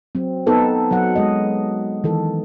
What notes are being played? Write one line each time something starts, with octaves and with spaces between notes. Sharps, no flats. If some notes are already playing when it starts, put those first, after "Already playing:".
F#3 C4
B3 D#4 A4 B4
F#3 F#5
G#3 D#5
D#3 E3 A4